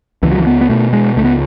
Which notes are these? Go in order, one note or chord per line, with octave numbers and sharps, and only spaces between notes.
C#2 E3
F#3
E3
B3
B3
B2 A3
G#3
C#2 A3
B3